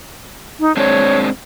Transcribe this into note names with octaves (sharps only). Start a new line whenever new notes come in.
D#4
G#3 C4 D4 C#5